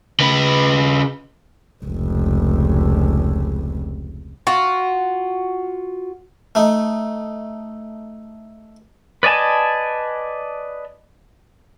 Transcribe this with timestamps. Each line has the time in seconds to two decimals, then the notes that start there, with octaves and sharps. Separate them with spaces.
0.20 C#3 B4
1.84 F1 C#2
4.47 F4 F#4
6.55 A3 D#4
9.23 B4 D5 D#5 G#5 A5